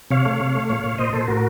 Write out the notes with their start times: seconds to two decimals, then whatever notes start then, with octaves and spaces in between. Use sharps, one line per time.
0.11 C3 C#5 F5
0.25 A3
0.40 C3
0.55 A3
0.69 A#2 C#5 F5
0.83 A#2
0.98 A#2 C5 D#5
1.13 A#2 A4 C5
1.28 A2 F#4 A#4